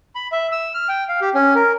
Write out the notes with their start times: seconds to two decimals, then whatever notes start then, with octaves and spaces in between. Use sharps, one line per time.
0.15 B5
0.32 E5
0.52 E6
0.74 F6
0.89 G5
1.09 F5
1.21 G4
1.35 C#4
1.55 A#4